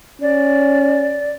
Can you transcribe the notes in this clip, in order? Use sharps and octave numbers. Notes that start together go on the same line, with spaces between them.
C#4 D5